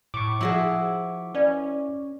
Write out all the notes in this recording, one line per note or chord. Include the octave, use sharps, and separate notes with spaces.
A2 C#6 D6
F3 E4 F#4 G#4
C#4 B4 D5 B5